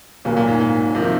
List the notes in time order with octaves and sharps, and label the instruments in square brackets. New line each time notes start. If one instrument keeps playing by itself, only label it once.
[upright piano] D#2 C#3 F#3 A#3 [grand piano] A#2
[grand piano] A#2
G#2
A#2
[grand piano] C3 [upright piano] F3 A#3
[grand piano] D#3